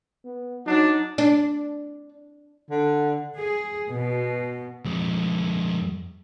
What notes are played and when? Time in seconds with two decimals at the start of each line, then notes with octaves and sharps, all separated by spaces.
0.25 B3
0.67 F#3 D4 D#4
1.18 D4
2.70 D3
3.38 G#4
3.90 B2
4.85 F2 G#3